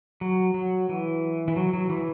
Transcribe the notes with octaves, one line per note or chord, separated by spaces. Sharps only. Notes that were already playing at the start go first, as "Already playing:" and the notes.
F#3
F#3
E3
E3
F#3
F#3
E3